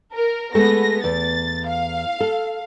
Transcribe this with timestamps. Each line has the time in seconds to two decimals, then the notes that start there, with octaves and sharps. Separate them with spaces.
0.14 A#4
0.55 G#3 A3 B3 A4 A#6
1.04 E2 A6
1.68 F5
2.20 A4